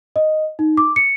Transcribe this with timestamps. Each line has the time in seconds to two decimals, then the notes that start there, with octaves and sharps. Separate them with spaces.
0.16 D#5
0.59 D#4
0.77 D6
0.96 C#7